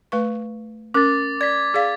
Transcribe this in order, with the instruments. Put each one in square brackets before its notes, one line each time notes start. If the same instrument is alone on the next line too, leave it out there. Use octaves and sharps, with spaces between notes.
[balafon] A3 B4 C#6
[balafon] C#4 A#4 [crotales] D6 A6
[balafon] D5 [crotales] G#6 B6
[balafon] G#4 D5 F5